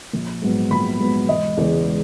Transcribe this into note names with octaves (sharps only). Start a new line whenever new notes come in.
A#1
G#2 F#3 B3
A#1 B5
G#2 F#3 B3
E1 D#5
E2 C#3 G#3